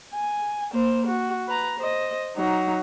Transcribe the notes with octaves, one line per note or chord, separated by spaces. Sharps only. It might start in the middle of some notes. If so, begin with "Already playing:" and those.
G#5
A#3 C5
F#4
B4 A#5
C5 D#5
F#3 D#4